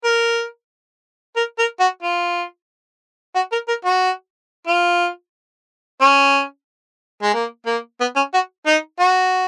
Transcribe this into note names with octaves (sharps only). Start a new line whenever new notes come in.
A#4
A#4
A#4
F#4
F4
F#4
A#4
A#4
F#4
F4
C#4
G#3
A#3
A#3
B3
C#4
F#4
D#4
F#4